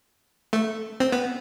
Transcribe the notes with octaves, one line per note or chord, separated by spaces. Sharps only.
A3
C4
B3